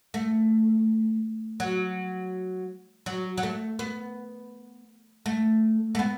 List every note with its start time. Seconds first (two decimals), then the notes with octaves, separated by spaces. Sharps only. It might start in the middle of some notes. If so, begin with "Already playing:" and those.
0.14 A3
1.60 F#3
3.06 F#3
3.37 F#3
3.43 A3
3.79 B3
5.26 A3
5.95 A3
5.99 B3